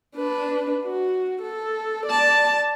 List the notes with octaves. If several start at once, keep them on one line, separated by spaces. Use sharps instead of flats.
D4 B4
F#4
A4
D5 A5